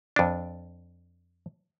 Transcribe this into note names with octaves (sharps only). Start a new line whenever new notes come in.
F2 D4